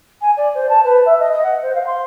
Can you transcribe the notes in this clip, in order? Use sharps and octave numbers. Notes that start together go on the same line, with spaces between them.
G#5
D5
C5
A5
B4
E5
D#5
D#5
F#5
C5
F5
C6